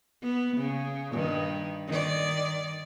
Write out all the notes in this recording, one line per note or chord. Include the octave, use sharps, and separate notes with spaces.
B3
C#3
G2 D#3
D#3 D5